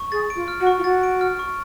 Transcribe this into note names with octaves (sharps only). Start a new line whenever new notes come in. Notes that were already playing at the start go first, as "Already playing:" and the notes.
Already playing: C#6
G#4 A6
D7
F4
F6
F#4
C#6
F4
F#4 A6
D7
F6
C#6